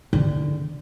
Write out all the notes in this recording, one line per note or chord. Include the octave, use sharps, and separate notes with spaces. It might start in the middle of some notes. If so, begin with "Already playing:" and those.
D3